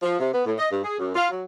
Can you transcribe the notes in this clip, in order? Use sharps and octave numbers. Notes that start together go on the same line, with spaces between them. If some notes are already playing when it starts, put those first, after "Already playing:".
F3
C3
B3
A2
D#5
G2
G#4
F#2
F4
F#3